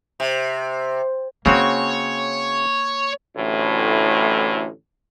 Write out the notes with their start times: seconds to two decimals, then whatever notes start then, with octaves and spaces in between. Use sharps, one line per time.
0.20 C3
1.46 C#3 A#3 C4 F#4 C#5
3.36 A1 D2 A2